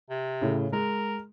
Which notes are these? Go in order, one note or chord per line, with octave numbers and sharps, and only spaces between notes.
C3
A2 C#3
G#3 A#4